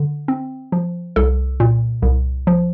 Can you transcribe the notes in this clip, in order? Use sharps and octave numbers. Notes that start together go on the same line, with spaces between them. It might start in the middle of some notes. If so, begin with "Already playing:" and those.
Already playing: D3
C4
F3
C2 A4
A#2
C2
F3